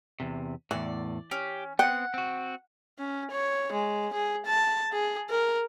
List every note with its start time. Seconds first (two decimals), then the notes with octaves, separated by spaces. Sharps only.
0.20 E2 C3
0.71 E2 A2 E3 D5
1.31 C#4 G4
1.79 B3 C4 F#5 G5
2.14 C4 F#4
2.99 C#4
3.32 C#5
3.72 G#3
4.13 G#4
4.46 A5
4.93 G#4
5.30 A#4